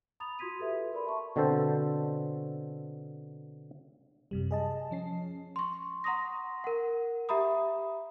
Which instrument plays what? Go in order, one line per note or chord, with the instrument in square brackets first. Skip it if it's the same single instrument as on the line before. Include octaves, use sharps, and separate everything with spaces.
[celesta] A#5 B5 D#6 A6 F7
F4 F#4 C6 G#6 B6 D#7
G4 A4 B4 E5
A#4 D5 B5 C6
E5 A5 C#6
[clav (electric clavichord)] B2 D3 C4 A4 C5
[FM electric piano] F#2 C3 G3
G#4 D#5 A5
F3 C#4 C7
[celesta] C6 C#6
F#5 A#5 C6 C#6 D#6 A#6
A#4 F#5
G4 E5 A#5 B5 D#6